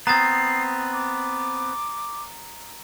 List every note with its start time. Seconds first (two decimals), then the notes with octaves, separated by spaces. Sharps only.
0.07 B3 C4 A#5 D#6 A6 C7
0.93 D6